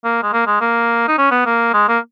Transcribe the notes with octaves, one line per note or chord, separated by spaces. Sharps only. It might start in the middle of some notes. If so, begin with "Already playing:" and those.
A#3
G#3
A#3
G#3
A#3
D#4
C#4
B3
A#3
G#3
A#3